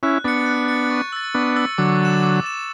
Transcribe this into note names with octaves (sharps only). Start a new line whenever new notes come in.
C#4 E4 F#6
B3 D4 A6 C#7
F#6
A6 C#7
C#6
E6 A6
B3 D4 C#6
E6 A6
D3 F#3 D6
A6 E7
D6
A6 E7